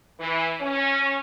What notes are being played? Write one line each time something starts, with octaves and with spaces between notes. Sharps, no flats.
E3
C#4